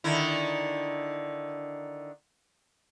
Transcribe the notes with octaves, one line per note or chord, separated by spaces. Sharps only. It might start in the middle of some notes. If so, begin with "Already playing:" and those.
D3 D#3 E4